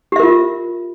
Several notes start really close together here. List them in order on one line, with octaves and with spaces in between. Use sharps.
G4 E5 A#4 F4